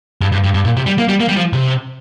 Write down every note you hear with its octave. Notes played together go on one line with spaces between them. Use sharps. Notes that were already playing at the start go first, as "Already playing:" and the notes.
G2
G2
G2
G2
A#2
C3
G3
A#3
G3
A#3
G3
F3
C3